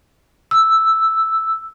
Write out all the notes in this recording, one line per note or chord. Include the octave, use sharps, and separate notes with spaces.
E6